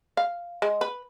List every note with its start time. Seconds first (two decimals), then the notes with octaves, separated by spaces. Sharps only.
0.17 F5
0.62 G#3
0.81 B4